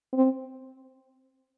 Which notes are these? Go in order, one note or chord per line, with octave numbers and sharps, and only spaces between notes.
C4